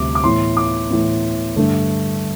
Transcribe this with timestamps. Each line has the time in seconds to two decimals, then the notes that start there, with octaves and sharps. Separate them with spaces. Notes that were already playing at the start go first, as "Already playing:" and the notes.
Already playing: D2 C3 G3 D6
0.15 D6
0.23 A2 E3 B3 C6
0.57 D6
0.90 A2 E3 B3
1.56 G2 D3 A3